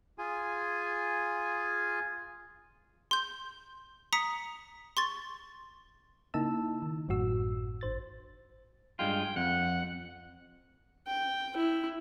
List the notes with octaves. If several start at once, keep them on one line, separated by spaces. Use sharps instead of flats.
F4 G#4 G#5
C6 G6
A#5 D#6 B6 C#7
C6 C#6 A6
C#3 A#3 D#4 E4 A5 E6
D#3
G#1 F#2 A2 F#4 E6
G#1 C5 A6
G2 G#3 F4 G5
F2 F#5
G5
E4